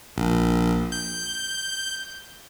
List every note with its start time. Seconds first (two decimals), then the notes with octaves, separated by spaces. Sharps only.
0.16 A#1
0.92 G6